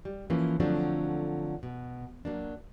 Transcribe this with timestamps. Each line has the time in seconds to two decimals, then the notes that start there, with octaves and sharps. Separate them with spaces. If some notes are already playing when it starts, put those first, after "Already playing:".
0.05 G3
0.30 E3 F3 A#3 C#4
0.60 D3 F3 F#3 A3 C4 D4
1.63 B2
2.25 F#3 A#3 D4